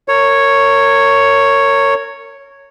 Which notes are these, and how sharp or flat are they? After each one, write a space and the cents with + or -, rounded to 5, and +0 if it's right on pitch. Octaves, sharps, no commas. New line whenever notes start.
A#4 -30 C#5 +0